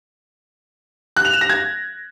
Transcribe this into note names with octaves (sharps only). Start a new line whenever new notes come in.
F#6
F7
E7
A#6
G#6